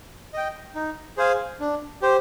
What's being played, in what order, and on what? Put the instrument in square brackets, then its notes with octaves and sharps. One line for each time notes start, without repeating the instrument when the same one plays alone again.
[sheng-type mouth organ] D#5 G5
D#4
G#4 C5 F5 G#5
D4
G4 C5